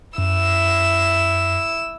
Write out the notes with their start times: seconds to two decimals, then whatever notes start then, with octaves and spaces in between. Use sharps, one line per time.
0.18 F#2 E4 E6